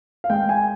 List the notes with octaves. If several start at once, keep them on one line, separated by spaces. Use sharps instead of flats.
F5
G#3 G5
G#5